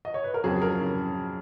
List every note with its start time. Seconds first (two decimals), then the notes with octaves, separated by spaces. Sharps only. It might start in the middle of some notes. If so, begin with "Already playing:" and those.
0.05 D#5
0.14 C#5
0.24 B4
0.34 A#4
0.44 F2 C#3 F#3 G#4
0.62 A#4
0.81 C#3